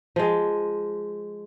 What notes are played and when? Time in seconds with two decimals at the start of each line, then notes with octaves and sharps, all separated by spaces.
0.16 F3 G#3